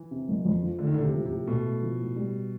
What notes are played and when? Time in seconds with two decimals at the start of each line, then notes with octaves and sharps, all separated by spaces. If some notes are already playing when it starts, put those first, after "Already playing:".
Already playing: E3
0.11 C3
0.28 F#1
0.45 F2
0.62 F3
0.79 D3 A3
0.87 D#3
0.94 A2 D3
1.03 C3
1.14 F3
1.26 C3
1.31 A2
1.47 B2 A3
1.65 A2
1.82 F3
2.00 A2
2.16 G3